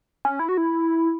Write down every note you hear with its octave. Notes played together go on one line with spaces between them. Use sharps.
C#4
E4
F#4
E4